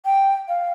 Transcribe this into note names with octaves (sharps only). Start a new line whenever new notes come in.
G5
F5